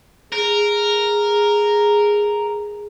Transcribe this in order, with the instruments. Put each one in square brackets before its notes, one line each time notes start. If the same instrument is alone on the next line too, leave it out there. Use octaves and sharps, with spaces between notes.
[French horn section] G#4 [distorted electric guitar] A#4